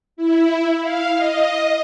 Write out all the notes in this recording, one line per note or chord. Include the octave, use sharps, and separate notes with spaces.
E4
F5
D#5